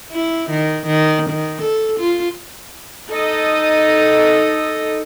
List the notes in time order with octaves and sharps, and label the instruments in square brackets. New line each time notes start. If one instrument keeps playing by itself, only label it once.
[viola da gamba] E4
D#3
D#3
D#3
A4
F4
[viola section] D#4 A4 D#5